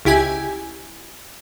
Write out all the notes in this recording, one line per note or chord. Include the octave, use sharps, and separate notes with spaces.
C#2 E4 G4 G#5